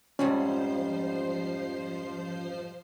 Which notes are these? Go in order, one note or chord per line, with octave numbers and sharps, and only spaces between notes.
F2 G#2 F3 G3 C#4 C5 C7